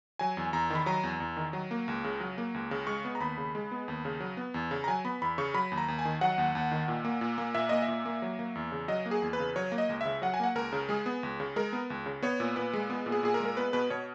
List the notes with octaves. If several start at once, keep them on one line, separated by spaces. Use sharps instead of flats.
F#3 G#5
E2
E2 A#5
D#3 B5
F#3 A#5
E2
E2
D#3
F#3
A#3
C#2
C#3
F#3
A#3
C#2
C#3
G#3 C#6
B3
A#5
D#2 B5
C#3
G#3
B3
D#2
C#3
F#3
B3
E2
C#3
A#5
F#3 G#5
B3 B5
E2 B5
C#3 C#6
F#3 B5
D#2
A#5
D#2
G#5
D#3
F#3 F#5
D#2
D#2
D#3
A#2
A#3
A#2
A#3
A#2 E5
A#3 D#5
E5
A#2
A#3
F#3
A#3
E2
C#3
F#3 D#5
A#3
G#4
E2
B4
C#3
F#3 C#5
A#3
D#5
C#2
C#3 E5
F#3 F#5
G#5
A#3 F#5
C#2 A#4
C#3
G#3 G#4
B3
C#2
C#3
G#3 A#4
B3
C#2
C#3
B3 C#5
A#2
A#2 B4
G#3
B3
A#2
G#4
A#2 G#4
A#4
G#3
A#4
B3 B4
B2 B4
B2 C#5